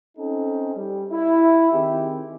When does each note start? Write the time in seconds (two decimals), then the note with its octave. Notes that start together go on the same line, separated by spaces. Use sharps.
0.18 C4 C#4 D#4 A4
0.76 G3
1.12 E4
1.72 D#3 C4 G4 G#4